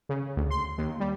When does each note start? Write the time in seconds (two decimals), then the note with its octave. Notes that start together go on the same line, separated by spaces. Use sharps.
0.09 C#3
0.37 D2
0.51 C6
0.78 D#2
1.00 G3